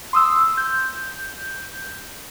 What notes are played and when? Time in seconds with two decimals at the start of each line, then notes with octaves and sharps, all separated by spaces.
0.13 C6 D#6 E6
0.57 G6